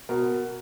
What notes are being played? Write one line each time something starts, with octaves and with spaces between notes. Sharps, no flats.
B2 A#4